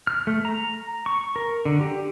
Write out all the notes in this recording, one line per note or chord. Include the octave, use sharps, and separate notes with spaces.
F6
A3
A#5
C#6
A#4
D3
G4